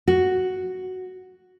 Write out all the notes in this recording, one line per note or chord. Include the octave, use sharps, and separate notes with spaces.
F#4